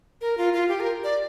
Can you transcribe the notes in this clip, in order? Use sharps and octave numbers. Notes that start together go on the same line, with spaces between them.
A#4
F4
F4
G4
A#4
D5